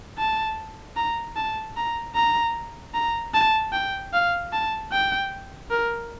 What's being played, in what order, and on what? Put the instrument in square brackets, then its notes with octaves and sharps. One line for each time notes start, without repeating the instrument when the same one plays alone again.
[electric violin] A5
A#5
A5
A#5
A#5
A#5
A5
G5
F5
A5
G5
A#4